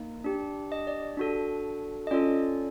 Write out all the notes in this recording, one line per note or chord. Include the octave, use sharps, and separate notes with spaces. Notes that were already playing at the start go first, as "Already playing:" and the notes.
Already playing: A#3 D#4
D4 G4
D#5
D5
D4 F#4 A4
D#5
C#4 F4 A4 D5